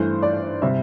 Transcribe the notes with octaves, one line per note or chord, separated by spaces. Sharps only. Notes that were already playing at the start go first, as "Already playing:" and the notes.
Already playing: G2 E3 A3 C5
D5
C3 G3 E5